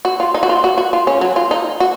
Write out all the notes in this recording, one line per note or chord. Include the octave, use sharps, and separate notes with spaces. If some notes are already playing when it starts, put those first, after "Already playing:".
F#4
F4
D#4
F#4
F4
F#4
F#4
F4
C#4
F#3
F4
D#4
F#4